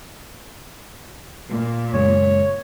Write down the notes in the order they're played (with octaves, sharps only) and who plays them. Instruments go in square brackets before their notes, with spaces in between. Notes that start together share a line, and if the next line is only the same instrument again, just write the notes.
[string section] A#2
[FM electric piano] F#2 C#3 G#3 [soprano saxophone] C#5